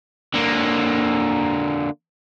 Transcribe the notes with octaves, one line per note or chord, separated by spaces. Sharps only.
D3 A#3